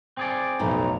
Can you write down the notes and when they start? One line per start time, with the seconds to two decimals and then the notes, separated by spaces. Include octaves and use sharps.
0.17 C4 G#4 D5
0.59 B1 F2 A2 A#5